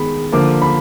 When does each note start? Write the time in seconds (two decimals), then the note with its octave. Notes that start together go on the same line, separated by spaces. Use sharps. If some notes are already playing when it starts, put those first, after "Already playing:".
Already playing: D#3 G#3 B3 B5
0.32 D3 F3 A#3 D6
0.62 B5